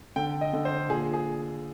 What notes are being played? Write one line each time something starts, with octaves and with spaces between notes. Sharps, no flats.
D3 G5
D#5
D3
C5
A#2 G#4
G#4